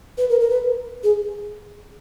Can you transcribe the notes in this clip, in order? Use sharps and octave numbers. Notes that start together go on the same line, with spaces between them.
B4
A#4
A#4
B4
G#4